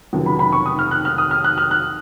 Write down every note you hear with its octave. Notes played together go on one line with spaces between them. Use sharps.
F1 D#2 C#3 F#3
B5
B5
C#6
D#6
F6
F#6
F6
D#6
F6
F#6
F6
F#6